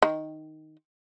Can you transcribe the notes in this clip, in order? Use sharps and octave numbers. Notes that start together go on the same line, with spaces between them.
D#3